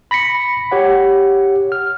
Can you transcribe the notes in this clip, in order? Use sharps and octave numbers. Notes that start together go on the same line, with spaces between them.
B5 A#6 B6 C#7
G4 C#5 F#5
F6